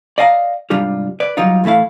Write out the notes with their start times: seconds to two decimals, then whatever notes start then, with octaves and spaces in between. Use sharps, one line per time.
0.18 D5 D#5 F5 G#5 A#5
0.70 C2 G#2 G3 D4 F4 G4
1.20 B4 D5
1.37 F#3 G3 D#4 F4
1.64 A2 E3 A3 E4 F5